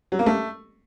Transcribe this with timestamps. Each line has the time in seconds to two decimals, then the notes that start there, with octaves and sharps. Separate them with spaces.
0.12 F#3
0.19 A#3
0.26 A3